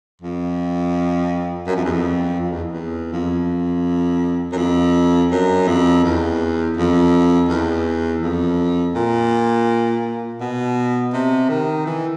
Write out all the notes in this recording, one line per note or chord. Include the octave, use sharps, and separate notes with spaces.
F2
F#2
F2
E2
F2
F2
E2
E2
F2
F#2
F2
F#2
F2
E2
F2
E2
F2
A#2
B2
C3
D#3
E3